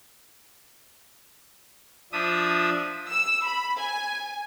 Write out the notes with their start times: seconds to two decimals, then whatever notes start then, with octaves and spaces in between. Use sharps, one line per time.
2.12 F3 D4 E5 D#6
3.09 E6
3.45 B5
3.79 G#5